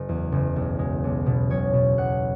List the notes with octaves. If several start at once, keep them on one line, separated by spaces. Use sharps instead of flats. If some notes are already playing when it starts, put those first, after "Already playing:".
Already playing: F#1
E2
F#1
B1
G#3
B1
B2
B1 C#5
B2
B1 F#5